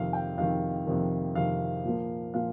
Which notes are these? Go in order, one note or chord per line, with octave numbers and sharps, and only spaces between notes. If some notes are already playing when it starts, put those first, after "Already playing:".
Already playing: F2 C3 D#3 F5
G5
F2 C3 D#3 F5
F2 C3 D#3
F2 C3 D#3 F5
A#2 F3 A#3
A#2 F3 A#3 F5